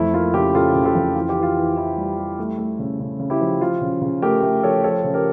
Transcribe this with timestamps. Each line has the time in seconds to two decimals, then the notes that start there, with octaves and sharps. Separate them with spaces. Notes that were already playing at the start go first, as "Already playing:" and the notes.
Already playing: F2 A3 E4
0.13 A#3 F4
0.33 C#3 E4 G4
0.54 C#3 F4 A4
0.75 C#3
0.85 F4 A4
0.95 F2
1.15 E3 F4
1.29 G4
1.36 E3
1.42 F4
1.56 E3
1.76 E3 E4
1.97 G3
2.18 G3
2.39 A3
2.58 A3
2.79 C#3
3.00 C#3
3.20 C#3
3.30 E4 G4
3.41 F3
3.61 F3 F4
3.81 C#3
4.01 C#3
4.22 A3 G4 A#4
4.43 A3
4.63 F3 A4 C#5
4.83 F3 A4 C#5
5.04 C#3
5.14 G4 A#4